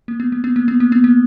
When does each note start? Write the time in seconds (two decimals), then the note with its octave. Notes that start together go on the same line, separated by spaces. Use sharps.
0.08 A#3
0.20 B3
0.32 A#3
0.44 B3
0.56 A#3
0.68 B3
0.80 A#3
0.92 B3
1.04 A#3